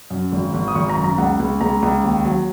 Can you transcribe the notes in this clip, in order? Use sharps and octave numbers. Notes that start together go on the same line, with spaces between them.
F#2
G#1
G#1
D#6
G#1 C#6
A#5
F#2
A#5
C#2 F#5
C#2
C#2 A#5
C#2
D#2
F#3